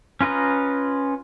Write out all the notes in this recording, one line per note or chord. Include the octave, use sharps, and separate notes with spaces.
C#4 F4 B4 D#5 A#5